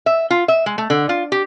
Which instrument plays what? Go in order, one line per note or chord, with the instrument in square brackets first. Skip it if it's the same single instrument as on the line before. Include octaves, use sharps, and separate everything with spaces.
[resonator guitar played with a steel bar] E5
F4
E5
G#3
A3
D3
F4
G4